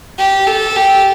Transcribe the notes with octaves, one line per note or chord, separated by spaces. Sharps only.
G4
A4
G4